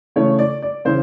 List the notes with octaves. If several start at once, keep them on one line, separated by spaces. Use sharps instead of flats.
C#3 E3 A3 C#5
D5
D5
C#3 E3 C5